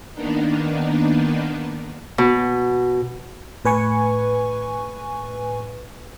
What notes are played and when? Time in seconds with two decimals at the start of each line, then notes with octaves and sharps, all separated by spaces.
0.14 D#3 A#3 B3 D4 D#4
2.18 B2
3.65 A2 B4 G#5 C#6